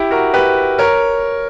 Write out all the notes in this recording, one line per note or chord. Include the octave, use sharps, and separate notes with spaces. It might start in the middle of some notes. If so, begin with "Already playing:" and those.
Already playing: E4 G4
F#4 A#4
G4 B4
A#4 C#5